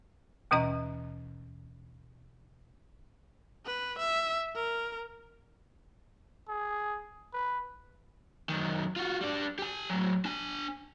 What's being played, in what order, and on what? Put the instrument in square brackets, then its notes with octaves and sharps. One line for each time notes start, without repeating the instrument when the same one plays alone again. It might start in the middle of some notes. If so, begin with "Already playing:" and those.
[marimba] D#2 B2 E3 C#4 D#5 A#5
[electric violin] B4
E5
A#4
[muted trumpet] G#4
B4
[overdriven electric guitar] F#2 D#3
F4 F#4
G3 D4
G4 G#5
A2 F#3
D4 G#5